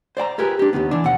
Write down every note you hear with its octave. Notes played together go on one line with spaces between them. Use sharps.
C5 D5 G5 A#5
F4 G4 G#4 A#4 B4
D4 G4
D#2 G#2 D#3 B3
E3 D4
D#2 B2 F#5